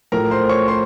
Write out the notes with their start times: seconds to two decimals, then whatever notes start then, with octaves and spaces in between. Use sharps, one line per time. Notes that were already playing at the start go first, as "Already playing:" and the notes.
0.12 A2 F3 A3 A#4 A#5
0.31 C5 C6
0.49 C#5 C#6
0.68 C5 C6